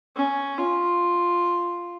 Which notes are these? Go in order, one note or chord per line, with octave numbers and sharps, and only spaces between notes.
C#4
F4